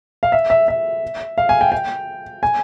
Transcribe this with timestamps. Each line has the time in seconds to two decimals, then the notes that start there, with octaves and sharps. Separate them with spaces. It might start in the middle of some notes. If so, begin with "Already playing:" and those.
0.23 F5
0.32 E5
0.50 E5
0.68 E5
1.38 F5
1.49 G#5
1.61 G5
1.72 G5
2.43 G#5